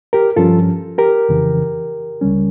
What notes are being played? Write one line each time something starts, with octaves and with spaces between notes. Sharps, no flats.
G4 A#4
G2 F3 C#4 F4 A4
G4 A#4
F2 C#3 E3
C#2 C#3 G3 C#4